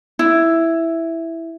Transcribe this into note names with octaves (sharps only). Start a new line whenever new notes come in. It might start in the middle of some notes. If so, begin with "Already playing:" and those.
E4